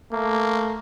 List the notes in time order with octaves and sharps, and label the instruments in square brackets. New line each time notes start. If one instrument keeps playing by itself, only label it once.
[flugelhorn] A3 [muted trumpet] A#3